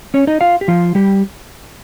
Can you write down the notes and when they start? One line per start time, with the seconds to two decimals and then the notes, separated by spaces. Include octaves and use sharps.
0.14 C#4 C#5
0.27 D#4 D#5
0.41 F4 F5
0.61 G4
0.68 F3 F4
0.95 G3 G4